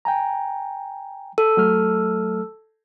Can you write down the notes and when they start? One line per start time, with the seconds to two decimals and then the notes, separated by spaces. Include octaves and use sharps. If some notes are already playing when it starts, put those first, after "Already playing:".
0.05 G5 G#5 A#5
1.38 A4
1.57 F#3 A3 F6